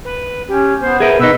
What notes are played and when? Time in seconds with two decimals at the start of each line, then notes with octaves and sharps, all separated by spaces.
0.05 B4
0.48 C#4 G4
0.81 B3 C5
1.00 G#4 A#4 B4 E5
1.20 B2 D#4 B4 E6